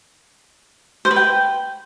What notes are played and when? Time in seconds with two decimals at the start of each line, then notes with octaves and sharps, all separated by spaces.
1.05 C5
1.11 B4
1.16 G5